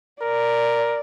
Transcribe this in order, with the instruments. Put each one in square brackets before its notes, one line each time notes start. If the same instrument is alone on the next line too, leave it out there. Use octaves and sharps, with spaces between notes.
[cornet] A#4 [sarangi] D5